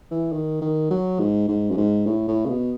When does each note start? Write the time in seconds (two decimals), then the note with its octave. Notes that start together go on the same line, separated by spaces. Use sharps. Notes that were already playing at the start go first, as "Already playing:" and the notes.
0.11 E3
0.33 D#3
0.61 D#3
0.91 F#3
1.20 G#2
1.49 G#2
1.71 F#2
1.77 G#2
2.06 A2
2.28 A2
2.46 C#3
2.49 B2